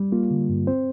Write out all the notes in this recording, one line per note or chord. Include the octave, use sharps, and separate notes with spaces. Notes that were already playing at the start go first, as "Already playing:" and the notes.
Already playing: G3
A#3 F4
D3
G2
C4 C5